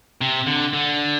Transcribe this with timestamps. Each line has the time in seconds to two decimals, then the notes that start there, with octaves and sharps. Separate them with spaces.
0.21 C3
0.46 D3
0.73 D3